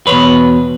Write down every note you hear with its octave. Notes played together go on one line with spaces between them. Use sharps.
E2 B2 B4 C#5